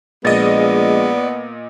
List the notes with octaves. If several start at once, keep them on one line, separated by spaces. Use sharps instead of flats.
A#1 A#2 G#3 B3 D5 D#5